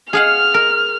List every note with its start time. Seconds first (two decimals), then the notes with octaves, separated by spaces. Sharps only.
0.13 G#4 F5 F#5 F6
0.54 A#4